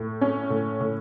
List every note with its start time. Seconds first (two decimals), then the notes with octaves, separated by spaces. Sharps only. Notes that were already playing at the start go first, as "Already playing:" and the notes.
Already playing: A2
0.21 C#4
0.50 A2
0.80 A2